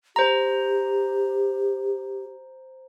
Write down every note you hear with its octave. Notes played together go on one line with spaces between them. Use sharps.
G4 C5 A#5